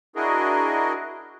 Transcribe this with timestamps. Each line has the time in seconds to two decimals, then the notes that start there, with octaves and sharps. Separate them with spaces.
0.16 D4 E4 F#4 G#4 A#4 D#5